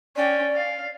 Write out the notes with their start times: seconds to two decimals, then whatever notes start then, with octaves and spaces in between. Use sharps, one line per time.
0.16 C#4 D5 G5
0.55 F5